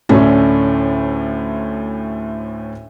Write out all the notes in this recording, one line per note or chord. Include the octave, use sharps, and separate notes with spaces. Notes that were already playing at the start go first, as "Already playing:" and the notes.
D2 A2 D3 A3 C#4 D4